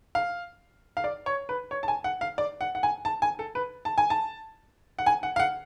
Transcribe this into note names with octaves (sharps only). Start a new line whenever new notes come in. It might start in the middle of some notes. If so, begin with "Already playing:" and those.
F5
F5
D5
C#5
B4
C#5
A5
G#5
F#5
F5
D5
F#5
F#5
G#5
A5
G#5
A4
B4
A5
G#5
A5
F#5
G#5
F#5
F5
F#5